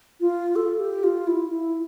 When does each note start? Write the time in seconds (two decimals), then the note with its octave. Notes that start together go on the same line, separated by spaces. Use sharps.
0.21 F4
0.56 A4
0.80 G4
1.04 F4
1.27 E4
1.51 E4